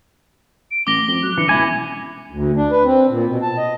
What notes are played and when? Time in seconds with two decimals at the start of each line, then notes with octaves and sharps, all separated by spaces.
0.71 D7
0.87 A1 D6 A#6 G7
1.08 F2
1.23 F#3 F#6
1.38 D3 E3 C#7
1.49 C#2 B2 E4 G#5 B5
2.31 D2
2.56 D4
2.71 B4
2.84 C4
3.09 A#2
3.25 B2
3.42 A5
3.57 D#5